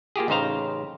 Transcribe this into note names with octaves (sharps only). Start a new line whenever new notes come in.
A#3 F4 G4 G#4
A1 C#3 D#4 C5 F5 A#5